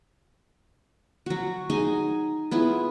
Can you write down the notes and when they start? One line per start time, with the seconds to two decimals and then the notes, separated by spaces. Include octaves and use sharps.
1.26 F#3 F#4
1.70 D#4 G#4 G#5
2.51 B3 E4 F4 G#4